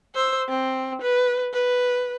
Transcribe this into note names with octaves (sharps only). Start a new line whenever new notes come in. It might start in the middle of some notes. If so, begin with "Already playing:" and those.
C5 E6
C4
B4
B4